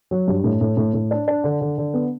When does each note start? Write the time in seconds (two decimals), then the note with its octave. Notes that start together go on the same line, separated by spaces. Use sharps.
0.11 F#3
0.28 G2
0.44 A2
0.61 A2
0.77 A2
0.94 A2
1.11 D4
1.28 D4
1.44 D3
1.61 D3
1.78 D3
1.94 B3